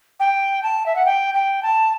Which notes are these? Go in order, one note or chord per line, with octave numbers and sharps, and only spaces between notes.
G5
A5
E5
F#5
G5
G5
A5